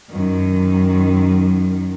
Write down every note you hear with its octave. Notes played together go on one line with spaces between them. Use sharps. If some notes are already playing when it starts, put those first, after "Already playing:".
F#2 D#3